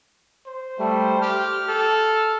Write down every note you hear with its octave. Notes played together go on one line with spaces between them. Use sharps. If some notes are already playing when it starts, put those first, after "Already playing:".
C5
G3 A3
G4 F6
A4